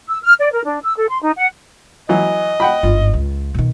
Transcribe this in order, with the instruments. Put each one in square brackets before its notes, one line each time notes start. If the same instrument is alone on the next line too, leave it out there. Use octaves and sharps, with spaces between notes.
[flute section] E6
F6
D5
A#4
D4
E6
A4
C6
D#4
F#5
[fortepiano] E3 F#3 [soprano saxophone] D#5
[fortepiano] F#5 G5 B5
[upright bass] G1 G#2 [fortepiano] F4
[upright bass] C#2
B2 D#3